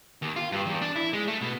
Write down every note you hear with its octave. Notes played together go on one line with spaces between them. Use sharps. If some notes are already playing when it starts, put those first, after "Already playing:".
D#2
F4
G2
E2
D4
E4
G#3
A3
B2